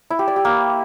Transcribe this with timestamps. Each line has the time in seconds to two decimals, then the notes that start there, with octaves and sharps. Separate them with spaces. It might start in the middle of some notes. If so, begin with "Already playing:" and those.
0.10 E4
0.19 G4
0.28 D5
0.36 G4
0.45 A#3